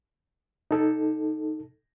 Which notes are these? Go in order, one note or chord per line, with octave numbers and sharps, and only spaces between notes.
D#4 A4